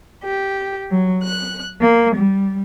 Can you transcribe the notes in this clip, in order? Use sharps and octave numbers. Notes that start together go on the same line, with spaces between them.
G4
F#3
F#6
A#3
G3